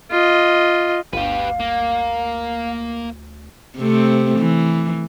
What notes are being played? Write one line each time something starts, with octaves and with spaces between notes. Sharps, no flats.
F4 D#5
G1 D2 G4 B4 F5
A#3
C3 A3 C4
E3